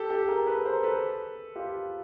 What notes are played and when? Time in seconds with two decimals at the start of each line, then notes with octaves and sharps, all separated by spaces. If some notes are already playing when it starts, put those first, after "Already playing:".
Already playing: G4 A4
0.10 G4 A4
0.28 G#4 A#4
0.47 A4 B4
0.65 A#4 C5
0.83 A4 B4
1.56 F4 G4